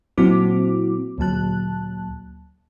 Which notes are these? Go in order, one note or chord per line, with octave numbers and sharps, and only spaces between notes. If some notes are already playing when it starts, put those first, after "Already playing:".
A#2 F#3 C4 E4 F#4 D6
D2 A#2 F#3 A5 F#6